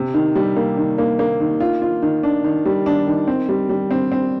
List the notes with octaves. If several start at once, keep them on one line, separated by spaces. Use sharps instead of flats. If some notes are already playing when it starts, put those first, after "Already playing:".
Already playing: C3
D#3
G3
A#3
D#3
A#3
A#3
D#3
F4
F4
D#3
D4
D#3
G3
D4
D#3
C4
G3
G3
C4
C4